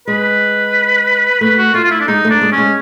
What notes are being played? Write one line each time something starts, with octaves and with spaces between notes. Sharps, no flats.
G#3 B4
A3 B4
F#4
A3 F4
F4
E4
D4
G#3 D#4
A3
D4
G#3
C#4
G#3